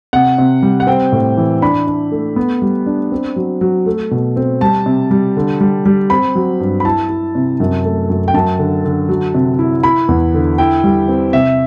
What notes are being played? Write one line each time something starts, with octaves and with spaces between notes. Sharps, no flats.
C3 F#5
C3
G3
F#5
C4 G5
A2
E3
D4 B5
D4
A3
B3
G3
D4
C4
F#3
F#3
A3
B2
C4
G3 A5
C3
G3
D3
G3
G3
C4 B5
F#3
G2
B5
E4 A5
E4
C3
F#2
A3
F#2
G5
F#2 A5
D3
D3
F#3
C3
E4
E4 B5
E2
D3
E4 G5
G3
C4
C3 E5